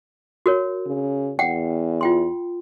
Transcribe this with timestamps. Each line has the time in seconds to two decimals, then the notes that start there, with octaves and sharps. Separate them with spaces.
0.46 F#4 A#4 C#5
0.86 C#3
1.39 E2 F#5 G5
2.01 F4 G5 C6